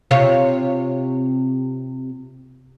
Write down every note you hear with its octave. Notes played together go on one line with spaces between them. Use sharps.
C3 F4 C#5